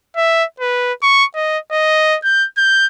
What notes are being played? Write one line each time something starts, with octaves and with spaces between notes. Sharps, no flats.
E5
B4
C#6
D#5
D#5
G6
G6